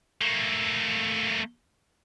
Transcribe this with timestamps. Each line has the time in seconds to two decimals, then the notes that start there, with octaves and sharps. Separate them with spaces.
0.21 A3 A#3